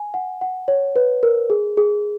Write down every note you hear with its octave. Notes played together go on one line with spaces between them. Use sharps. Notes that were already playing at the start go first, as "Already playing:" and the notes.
Already playing: G#5
F#5
F#5
C#5
B4
A#4
G#4
G#4